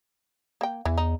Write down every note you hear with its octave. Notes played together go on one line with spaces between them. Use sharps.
A#3 G5
E2 E3
D#4